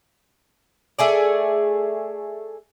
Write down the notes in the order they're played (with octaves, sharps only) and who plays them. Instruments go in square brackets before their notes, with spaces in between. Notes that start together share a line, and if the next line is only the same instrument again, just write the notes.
[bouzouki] A3 G#4 D5